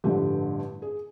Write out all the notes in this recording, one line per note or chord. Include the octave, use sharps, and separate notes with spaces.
A1 G2 D3 F3 A3 G4
G#4